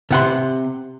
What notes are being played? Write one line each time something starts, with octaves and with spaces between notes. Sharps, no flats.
C3 F#5 C6